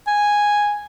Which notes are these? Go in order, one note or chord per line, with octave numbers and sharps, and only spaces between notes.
G#5